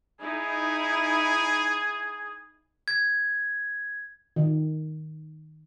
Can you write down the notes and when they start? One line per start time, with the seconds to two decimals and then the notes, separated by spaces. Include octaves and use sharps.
0.21 D#4 E4 G#4
2.88 G#6
4.36 D#3